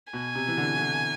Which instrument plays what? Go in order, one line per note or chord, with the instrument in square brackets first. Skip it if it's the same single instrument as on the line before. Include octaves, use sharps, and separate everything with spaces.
[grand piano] B2 [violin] G#5
[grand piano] C3
E3
D3
E3
D3